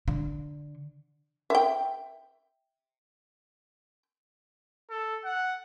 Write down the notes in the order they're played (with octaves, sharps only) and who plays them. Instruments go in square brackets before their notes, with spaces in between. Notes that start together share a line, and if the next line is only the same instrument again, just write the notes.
[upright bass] D3
[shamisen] E5 G5
[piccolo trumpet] A4
F#5